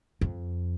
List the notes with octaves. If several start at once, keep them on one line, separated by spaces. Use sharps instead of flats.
F2